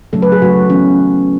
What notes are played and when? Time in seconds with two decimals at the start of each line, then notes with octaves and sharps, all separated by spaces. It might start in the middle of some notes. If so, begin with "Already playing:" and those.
0.13 C#3 F#3 A3 A4
0.22 B4
0.32 G#4
0.42 C#3 F#3 A3 F#4
0.70 E3 B3 C#4